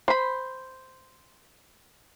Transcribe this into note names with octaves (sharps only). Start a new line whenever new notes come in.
C5 B5